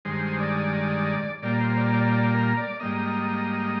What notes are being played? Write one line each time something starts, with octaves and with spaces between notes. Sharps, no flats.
G2 D#3 G#3 C5
D5
A#2 G3 A#3 D5
C5
D5
D5
D5
A#4
D5
G#2 G3 A#3 D#5